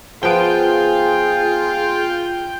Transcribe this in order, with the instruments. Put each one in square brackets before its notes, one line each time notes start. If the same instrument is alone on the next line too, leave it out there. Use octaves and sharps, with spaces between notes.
[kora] F3 B3 [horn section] F4 [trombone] G#4 [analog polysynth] G5